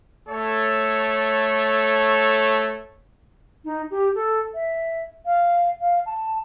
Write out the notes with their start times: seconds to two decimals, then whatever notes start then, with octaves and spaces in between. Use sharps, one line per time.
0.29 A3 A4 C#5
3.65 D#4
3.91 G4
4.15 A4
4.54 E5
5.26 F5
5.81 F5
6.06 A5